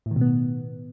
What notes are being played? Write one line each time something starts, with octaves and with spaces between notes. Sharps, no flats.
A2
D#3
B2
B3